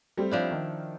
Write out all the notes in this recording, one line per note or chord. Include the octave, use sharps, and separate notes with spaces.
G3 A3 C4
F3 D4 E4
D#3